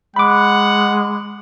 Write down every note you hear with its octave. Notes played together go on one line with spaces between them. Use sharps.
G#3 F#5 B5 D6